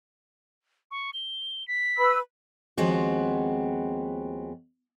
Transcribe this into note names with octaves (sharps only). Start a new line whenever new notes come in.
C#6
G7
B6
B4 B5 E6
D#2 F3 G#3 B3 C4 F#4